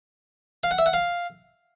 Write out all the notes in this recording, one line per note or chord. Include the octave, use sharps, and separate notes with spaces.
F5
F#5
E5
F#5
F5